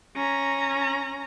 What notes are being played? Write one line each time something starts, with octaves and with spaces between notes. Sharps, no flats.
C#4 A#5